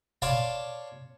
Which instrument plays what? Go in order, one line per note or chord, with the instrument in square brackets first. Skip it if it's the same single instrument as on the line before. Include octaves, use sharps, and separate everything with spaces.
[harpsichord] C#5 D5 F5 A5 C6 D6